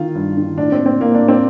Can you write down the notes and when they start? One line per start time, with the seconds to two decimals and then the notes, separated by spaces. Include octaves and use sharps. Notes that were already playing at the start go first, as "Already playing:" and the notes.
Already playing: D#3 F4
0.15 G2
0.37 D#3
0.58 A2 D4
0.72 C4
0.86 C4
1.00 A2 A#3
1.15 D4
1.28 C4